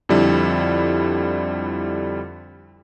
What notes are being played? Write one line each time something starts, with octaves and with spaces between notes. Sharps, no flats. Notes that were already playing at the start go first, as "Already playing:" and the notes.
F2 D3 G3 E4